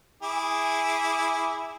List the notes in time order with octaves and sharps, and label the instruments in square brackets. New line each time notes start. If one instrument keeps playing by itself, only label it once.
[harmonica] E4 G#4 D6